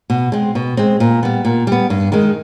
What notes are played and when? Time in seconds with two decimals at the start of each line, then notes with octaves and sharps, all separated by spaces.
0.10 B2
0.32 G#3 C4
0.55 B2
0.77 G#3 C4
1.00 A#2
1.23 G3 B3
1.45 A#2
1.67 G3 B3
1.90 G2
2.12 D#3 G#3